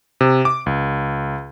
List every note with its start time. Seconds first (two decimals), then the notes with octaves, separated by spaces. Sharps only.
0.21 C3
0.45 D6
0.66 C#2